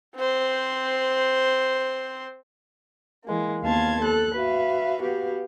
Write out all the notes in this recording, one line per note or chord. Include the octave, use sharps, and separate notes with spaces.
C4 C5
E3 G#3 A#3
D#2 B3 F5 A5 C6 G#6
A4 F#6
F#4 B4 E5 F5
B3 F#4 G4 F5